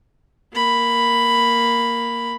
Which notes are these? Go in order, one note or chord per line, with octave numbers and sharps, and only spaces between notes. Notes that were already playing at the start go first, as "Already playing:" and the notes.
A#3 B5